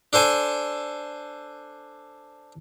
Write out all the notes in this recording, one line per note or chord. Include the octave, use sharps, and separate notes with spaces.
D4 A4 C5 G#5